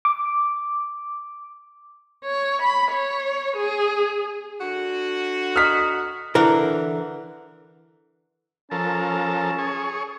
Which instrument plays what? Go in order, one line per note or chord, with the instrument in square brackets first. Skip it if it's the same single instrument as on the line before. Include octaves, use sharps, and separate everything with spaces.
[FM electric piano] D6
[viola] C#5
B5
C#5
G#4
[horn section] D3 F#4
[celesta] D#5 A#5 D#6 [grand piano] F6 B6
[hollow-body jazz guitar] D3 E3 A#4
[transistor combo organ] F3 A4 A#4 [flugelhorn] C#4 [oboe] A5
[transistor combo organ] G#4 C#5